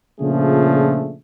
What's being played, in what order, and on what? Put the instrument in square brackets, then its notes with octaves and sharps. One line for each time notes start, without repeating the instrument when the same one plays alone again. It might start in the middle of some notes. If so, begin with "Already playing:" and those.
[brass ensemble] A#2 C#3 F3 A3 D4 G#4